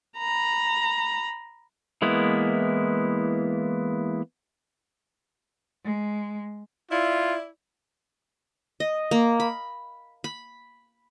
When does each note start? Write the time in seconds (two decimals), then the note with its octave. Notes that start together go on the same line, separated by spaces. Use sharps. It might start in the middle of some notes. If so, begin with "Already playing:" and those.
0.18 A#5 B5
2.02 E3 G#3 A#3 B3 E4
5.84 G#3
6.91 E4 F4 D5
8.80 D#5
9.11 A#3
9.40 B5
10.24 B5